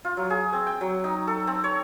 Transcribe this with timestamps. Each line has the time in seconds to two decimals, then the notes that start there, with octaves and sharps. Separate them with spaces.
0.05 F4
0.17 F#3
0.30 G#4
0.53 C4
0.67 G5
0.81 F#3
1.04 D#4
1.27 A4
1.47 C4
1.64 C#5